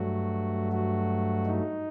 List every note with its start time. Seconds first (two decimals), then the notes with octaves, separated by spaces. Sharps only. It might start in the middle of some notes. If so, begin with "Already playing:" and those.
Already playing: G2 F#3 A3 F#4
0.73 F#4
1.46 D#4